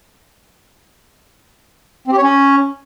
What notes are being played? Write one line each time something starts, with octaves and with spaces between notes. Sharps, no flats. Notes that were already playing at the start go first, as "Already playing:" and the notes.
C4
G4
C#5
C#4